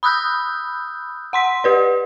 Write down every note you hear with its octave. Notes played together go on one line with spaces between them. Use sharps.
B5 D#6 E6 F#6 G6
F#5 C6 B6
G4 B4 D5